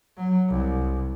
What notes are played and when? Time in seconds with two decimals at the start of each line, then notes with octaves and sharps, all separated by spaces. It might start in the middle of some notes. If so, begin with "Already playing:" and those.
0.17 F#3
0.50 C2